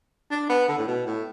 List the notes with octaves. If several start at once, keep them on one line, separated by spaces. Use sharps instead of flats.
D4
B3
D3
A2
B2
A2